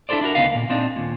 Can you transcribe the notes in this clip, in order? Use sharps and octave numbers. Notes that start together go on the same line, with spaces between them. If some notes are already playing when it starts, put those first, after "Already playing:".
D4 E4 G4 A4 C5 D5
D4 E4 F#4 A#4
D2 C#3 B3 D#4 F5
A#2 A#3
A#2 C4 D4 D#4
D#2 A#2